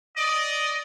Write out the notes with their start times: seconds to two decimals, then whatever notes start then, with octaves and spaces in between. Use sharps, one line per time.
0.16 D5 D#5